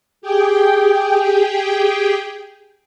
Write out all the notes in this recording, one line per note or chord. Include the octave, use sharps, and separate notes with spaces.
G4 G#4 G5